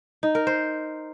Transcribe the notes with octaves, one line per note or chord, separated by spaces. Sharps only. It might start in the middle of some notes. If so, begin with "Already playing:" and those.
D#4
A#4
C5